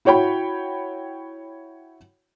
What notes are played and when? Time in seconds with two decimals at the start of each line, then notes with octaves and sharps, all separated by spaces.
0.05 E4 F#4 C#5 G5 B5